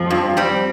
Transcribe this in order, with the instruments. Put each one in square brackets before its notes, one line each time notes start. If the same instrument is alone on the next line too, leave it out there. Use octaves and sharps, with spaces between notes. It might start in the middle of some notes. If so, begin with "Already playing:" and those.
Already playing: [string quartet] F2 F3
[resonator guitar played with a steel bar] G2
G3 C4